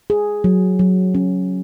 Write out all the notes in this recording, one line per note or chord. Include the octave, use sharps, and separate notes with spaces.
G#4
F#3
F#3
C#4